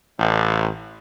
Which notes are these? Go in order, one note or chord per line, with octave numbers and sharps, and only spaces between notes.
A1